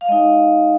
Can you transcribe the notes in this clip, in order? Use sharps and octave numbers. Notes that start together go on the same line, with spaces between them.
F5
G#3 D#4 D#5